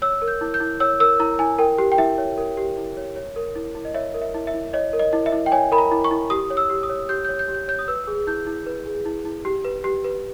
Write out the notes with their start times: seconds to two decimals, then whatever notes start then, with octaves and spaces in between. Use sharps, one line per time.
0.02 C#5 E6
0.22 A#4
0.28 G6
0.41 E4
0.54 G6
0.60 E4
0.80 C#5 E6
1.00 A#4 E6
1.19 E4 A#5
1.39 E4 G#5
1.59 A#4 G5
1.78 G4
1.92 G5
1.98 E4 E5
2.18 C#5
2.38 A#4
2.57 G4
2.77 E4
2.97 C#5
3.16 C#5
3.36 A#4
3.56 E4
3.75 E4
3.85 D#5
3.94 C#5 E5
4.14 A#4
4.21 E5
4.34 E4
4.47 E5
4.54 E4
4.73 C#5 D#5
4.93 A#4
4.99 D#5
5.13 E4
5.26 E5
5.32 E4
5.46 G5
5.52 C#5 G#5
5.72 A#4 B5
5.78 A#5
5.92 E4
6.04 C#6
6.11 E4
6.30 G4 D#6
6.50 C#5
6.57 E6
6.70 G4
6.83 D#6
6.89 C#5
7.09 G4 G6
7.25 G6
7.29 C#5
7.39 G6
7.48 G4
7.54 G6
7.68 C#5 G6
7.79 D#6
7.88 B4 E6
8.07 G#4
8.27 E4 G6
8.46 E4
8.66 B4
8.86 G#4
9.06 E4
9.25 E4
9.45 G4
9.65 B4
9.84 G4
10.04 B4